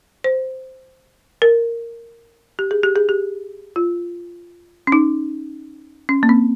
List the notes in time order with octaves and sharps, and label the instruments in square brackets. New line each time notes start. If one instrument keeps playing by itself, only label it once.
[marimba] C5
A#4
G4
G#4
G4
G#4
G4
F4
C#4
D#4
C#4
A#3
C4